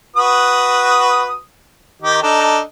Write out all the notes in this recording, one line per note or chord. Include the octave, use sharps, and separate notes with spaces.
F#4 B4 D#6
D#3 D#4 G4
D4 D#4 A4